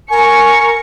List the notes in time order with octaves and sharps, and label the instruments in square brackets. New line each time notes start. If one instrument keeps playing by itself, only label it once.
[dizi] A#4 [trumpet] G#5 [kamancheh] C#6